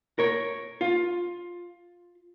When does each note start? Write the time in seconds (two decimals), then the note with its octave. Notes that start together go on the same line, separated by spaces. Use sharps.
0.19 A#4 C#5
0.81 F4